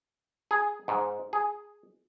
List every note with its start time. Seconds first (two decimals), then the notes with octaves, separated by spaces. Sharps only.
0.51 G#4
0.88 G#2
1.33 G#4